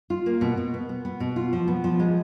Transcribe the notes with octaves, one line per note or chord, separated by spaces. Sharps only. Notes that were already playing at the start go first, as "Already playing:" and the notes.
F4
A#3
B2
B2
B3
B3
B3
B2
F4
F3
B3
F3
G#3